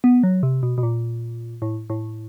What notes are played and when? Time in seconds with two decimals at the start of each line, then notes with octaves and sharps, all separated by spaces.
0.04 B3
0.23 F#3
0.43 C3
0.63 B2
0.78 B2
0.83 A#2
1.62 A2
1.90 A2